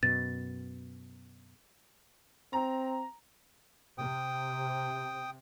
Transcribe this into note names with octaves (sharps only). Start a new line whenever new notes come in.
F#2 B2 A6
C4 A#5
C3 G5 D#6